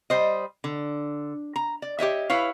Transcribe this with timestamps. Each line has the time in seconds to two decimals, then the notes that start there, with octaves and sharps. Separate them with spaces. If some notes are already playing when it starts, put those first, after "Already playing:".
0.10 G3 C5 D#5
0.64 D3
1.56 A#5
1.82 D5
1.99 G4 C#5 D#5 E5
2.30 E4 B4 C#5 F5